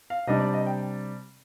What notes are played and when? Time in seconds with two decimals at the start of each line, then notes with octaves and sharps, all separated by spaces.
0.10 F5
0.27 C3 G3 D4 D#5
0.40 D5
0.54 D#5
0.67 G5